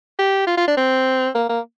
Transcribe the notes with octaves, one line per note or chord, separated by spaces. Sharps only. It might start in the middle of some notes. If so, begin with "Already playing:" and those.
G4
F4
F4
D4
C4
A#3
A#3